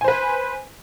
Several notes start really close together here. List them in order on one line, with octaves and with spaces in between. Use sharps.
G#5 C5 B4